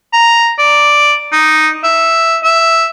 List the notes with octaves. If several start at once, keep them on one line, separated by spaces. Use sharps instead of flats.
A#5
D5
D#4
E5
E5